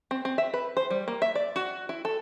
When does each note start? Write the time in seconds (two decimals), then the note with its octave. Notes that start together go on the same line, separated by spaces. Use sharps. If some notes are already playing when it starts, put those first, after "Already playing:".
0.11 C4
0.25 C4
0.38 E5
0.54 B4
0.77 C5
0.91 G3
1.08 A#3
1.22 E5
1.35 D5
1.56 F#4
1.89 E4
2.05 A4